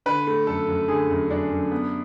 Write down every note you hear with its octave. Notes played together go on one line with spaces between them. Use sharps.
D3 B4
A3
F#2 A4
F#2
D3 G#4
F#2
F#2 D4
F#2
B3